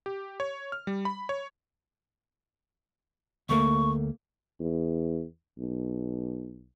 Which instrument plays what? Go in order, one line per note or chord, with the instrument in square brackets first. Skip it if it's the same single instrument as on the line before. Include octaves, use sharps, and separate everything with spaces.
[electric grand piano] G4
C#5
F6
G3
B5
C#5
[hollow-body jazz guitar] D2 A3 A#3 [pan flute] C#6
[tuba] E2
B1